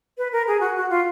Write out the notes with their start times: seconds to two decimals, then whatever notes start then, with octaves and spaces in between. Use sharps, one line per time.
0.18 B4
0.32 A#4
0.47 G#4
0.61 F#4
0.76 F#4
0.90 F4